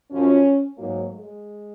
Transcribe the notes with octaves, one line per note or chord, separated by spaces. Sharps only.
F#2 F3 C#4
G#2 F#3 A#3
G#3